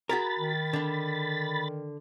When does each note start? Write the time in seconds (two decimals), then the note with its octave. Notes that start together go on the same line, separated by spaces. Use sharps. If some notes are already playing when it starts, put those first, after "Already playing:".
0.09 F#4 G#4 A#4 B5 A6
0.39 D#3
0.73 D3 D4